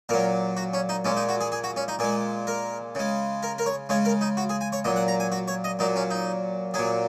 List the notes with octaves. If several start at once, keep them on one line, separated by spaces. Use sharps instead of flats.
A#2 F#3 A#4
F#4
C#4
D#4
A#2 G#3 C#4
D#4
F#4
G#4
G#4
F#4
C#4
D#4
A#2 G#3 G#4
A#4
C#3 G#3
A#4
A#4
C#5
C#3 G#3 C#5
A#4
D#4
F#4
G#4
G#5
C#5
A#2 F#3 D#5
F#5
A#5
G#5
F#4
C#5
D#5
A#2 F#3 D#4
C#4
D#4
A#2 F#3 G#4